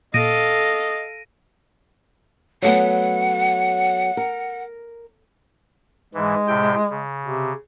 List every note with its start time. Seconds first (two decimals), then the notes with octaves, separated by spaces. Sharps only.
0.14 A#2 A4 D#5 F5 A#6 D7 D#7
2.62 F#3 A3 B3 F#5
4.17 A#4
6.14 G#2 E3 G#3
6.47 A2 C3 G5
6.89 C#3
7.24 C3